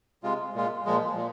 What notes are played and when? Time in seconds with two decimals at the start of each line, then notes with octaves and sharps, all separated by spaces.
0.23 C3 G#3 F4
0.54 A#2 G#3 F4
0.85 A#2 F3 G#3
1.16 A#2